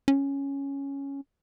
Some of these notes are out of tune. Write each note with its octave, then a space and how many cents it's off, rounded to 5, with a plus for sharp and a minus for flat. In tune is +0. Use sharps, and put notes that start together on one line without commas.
C#4 +0